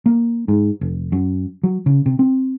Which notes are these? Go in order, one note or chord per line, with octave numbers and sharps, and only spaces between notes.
A#3
G#2
F1
F#2
F#3
C#3
C3
C4